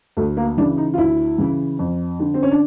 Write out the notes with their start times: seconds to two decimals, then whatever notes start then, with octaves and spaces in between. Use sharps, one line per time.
0.17 D2 A3
0.37 A#3
0.57 E3 D4
0.61 C#3
0.78 D#4
0.94 F4
0.98 D2 E4
1.38 C#3 E3
1.79 F2
2.20 D3
2.34 C4
2.43 C#4
2.52 D4